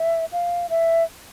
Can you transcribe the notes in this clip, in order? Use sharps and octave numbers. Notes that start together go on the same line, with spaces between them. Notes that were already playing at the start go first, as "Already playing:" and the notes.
Already playing: E5
F5
E5